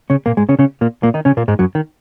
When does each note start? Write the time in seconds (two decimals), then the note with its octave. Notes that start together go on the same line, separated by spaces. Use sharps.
0.10 C#3 C#4
0.26 A#2 A#3
0.37 G#2 G#3
0.49 C#3 C#4
0.59 C#3 C#4
0.81 A#2 A#3
1.03 A#2 A#3
1.14 D#3 D#4
1.25 C#3 C#4
1.37 A#2 A#3
1.48 G#2 G#3
1.59 F#2 F#3
1.75 D#3